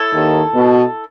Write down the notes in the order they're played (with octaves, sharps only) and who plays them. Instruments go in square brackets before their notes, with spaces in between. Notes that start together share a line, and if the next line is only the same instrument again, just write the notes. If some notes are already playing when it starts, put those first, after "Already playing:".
Already playing: [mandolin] E4 A4 C#5
[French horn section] D#2 D#3
B2